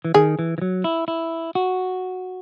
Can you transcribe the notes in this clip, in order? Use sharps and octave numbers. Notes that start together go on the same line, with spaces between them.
E3
D#3 G#4
E3
E3
F#3
E4
E4
F#4